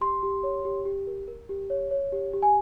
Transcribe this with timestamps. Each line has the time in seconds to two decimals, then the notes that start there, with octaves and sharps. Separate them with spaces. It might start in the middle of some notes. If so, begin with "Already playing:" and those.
0.01 G4 C6
0.23 G4
0.43 C#5
0.65 G4
0.85 G4
1.07 A#4
1.28 A#4
1.49 G4
1.70 C#5
1.91 C#5
2.12 G4
2.34 G4
2.42 G#5